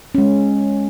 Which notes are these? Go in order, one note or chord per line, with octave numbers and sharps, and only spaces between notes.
G#3 C#4